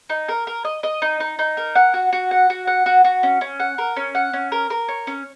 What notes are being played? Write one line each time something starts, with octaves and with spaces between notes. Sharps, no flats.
D#4
A#4
A#4
D#5
D#5
D#4
D#4
D#4
A#4
F#5
F#4
F#4
F#5
F#4
F#5
F#4
F#4
C#4
C#4
F#5
A#4
C#4
F#5
C#4
A#4
A#4
C#5
C#4